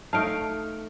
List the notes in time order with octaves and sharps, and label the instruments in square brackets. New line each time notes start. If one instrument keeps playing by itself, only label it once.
[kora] A3 D#4 F5 [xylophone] A5 D7